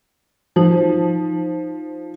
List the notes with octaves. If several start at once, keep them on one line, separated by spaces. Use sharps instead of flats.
F3 D#4 C5